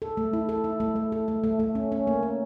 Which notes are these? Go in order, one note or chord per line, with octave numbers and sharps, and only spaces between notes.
A4
A3
E4
A4
E4
A3
A3
A4
A3
A3
A3
C#4
C#4
A#3
C#4